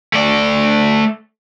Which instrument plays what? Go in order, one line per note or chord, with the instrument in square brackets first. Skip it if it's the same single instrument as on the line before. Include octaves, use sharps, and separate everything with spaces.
[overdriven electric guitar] A3 D5